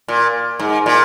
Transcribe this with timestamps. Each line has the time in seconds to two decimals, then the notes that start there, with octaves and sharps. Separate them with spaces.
0.08 A#2
0.59 G#2
0.86 A#2